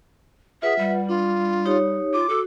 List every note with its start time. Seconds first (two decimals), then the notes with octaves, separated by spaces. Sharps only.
0.62 F4 G#4 B4 E5 F#5
0.79 G3
1.09 D4 F4
1.66 D#4 G4 C#5
2.14 F4 D6
2.29 F#4 A4